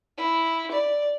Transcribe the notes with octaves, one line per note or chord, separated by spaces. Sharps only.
E4
D5